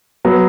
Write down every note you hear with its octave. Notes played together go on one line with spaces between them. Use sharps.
F#3 B3